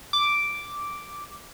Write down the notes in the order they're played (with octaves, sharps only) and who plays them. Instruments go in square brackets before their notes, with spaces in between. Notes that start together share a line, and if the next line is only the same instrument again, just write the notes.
[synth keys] D6